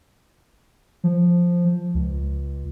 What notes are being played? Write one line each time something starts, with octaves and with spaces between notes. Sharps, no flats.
F3
C#2